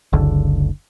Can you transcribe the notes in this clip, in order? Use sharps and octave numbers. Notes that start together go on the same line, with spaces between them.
F#1 C#2 D3